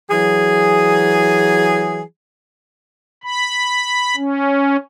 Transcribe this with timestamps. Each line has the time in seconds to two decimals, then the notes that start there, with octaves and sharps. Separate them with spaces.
0.11 E3 F#3 G#4
3.24 B5
4.16 C#4